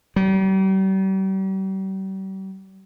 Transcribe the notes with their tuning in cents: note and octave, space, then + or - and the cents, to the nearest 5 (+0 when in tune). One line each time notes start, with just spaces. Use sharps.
G3 -40